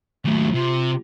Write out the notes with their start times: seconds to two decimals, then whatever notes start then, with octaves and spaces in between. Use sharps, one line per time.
0.25 D#2 F#3 A3
0.54 C3 F4